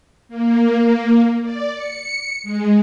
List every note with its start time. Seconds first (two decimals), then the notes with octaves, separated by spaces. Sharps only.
0.29 A#3
1.42 D5
1.75 C#7
2.43 G#3